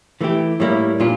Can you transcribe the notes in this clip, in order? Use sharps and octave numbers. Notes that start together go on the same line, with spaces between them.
E3 A3 E4 G4
A2 G3 A#3 E4
A#2 G3 D4 F4